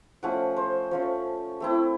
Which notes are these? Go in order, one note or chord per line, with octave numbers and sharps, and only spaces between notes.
F3 A3 C#4 F#5
C5
F3 A3 C#4 C#5
A3 C4 E4